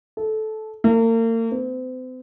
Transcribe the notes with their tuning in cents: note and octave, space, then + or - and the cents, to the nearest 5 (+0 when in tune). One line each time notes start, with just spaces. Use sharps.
A4 -15
A#3 -40
C4 -40